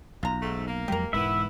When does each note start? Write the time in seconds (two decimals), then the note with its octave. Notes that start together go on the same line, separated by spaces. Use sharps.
0.23 B1 F4 A#5
0.42 G#2 A3
0.67 A#3
0.88 F2 F#3 G#3 G4 A#4
1.13 E1 G#2 B3 E4 E5